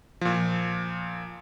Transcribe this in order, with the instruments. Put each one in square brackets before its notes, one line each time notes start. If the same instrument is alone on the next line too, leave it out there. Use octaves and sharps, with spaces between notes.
[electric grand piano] A#2 F3